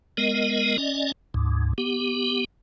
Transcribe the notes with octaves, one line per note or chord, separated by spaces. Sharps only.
G#3 B3 A#4 D#5
C#4 D5 D#5
D2 G#2
B3 G4